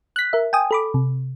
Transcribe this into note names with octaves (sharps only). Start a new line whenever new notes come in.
F#6 B6
A#4 E5
G5 G#5 D#6
A4 B5 D6
C3